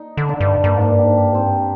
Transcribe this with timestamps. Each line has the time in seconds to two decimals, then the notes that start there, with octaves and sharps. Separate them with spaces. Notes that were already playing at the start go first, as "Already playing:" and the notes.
Already playing: D#4
0.17 D3
0.29 D4
0.40 G2
0.64 G2 A#3
0.77 G#2 D4
0.91 G2
0.98 G4
1.05 G#2
1.17 G2 G4
1.31 G#2 C4
1.45 G2